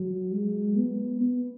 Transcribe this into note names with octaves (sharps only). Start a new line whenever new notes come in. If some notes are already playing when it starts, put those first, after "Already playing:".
Already playing: F#3
G#3
B3
B3